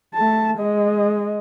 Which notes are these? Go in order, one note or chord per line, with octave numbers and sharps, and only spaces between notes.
A3 A5
G#3 D#5